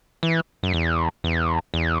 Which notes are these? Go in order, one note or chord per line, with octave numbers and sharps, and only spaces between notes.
E3
F#2
E2
E2
E2